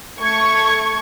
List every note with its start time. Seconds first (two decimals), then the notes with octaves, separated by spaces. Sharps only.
0.21 A3 C#6 G#6